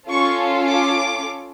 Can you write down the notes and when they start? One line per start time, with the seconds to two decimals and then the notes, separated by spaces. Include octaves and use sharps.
0.10 C#4 F4 A4 C#6
0.69 D6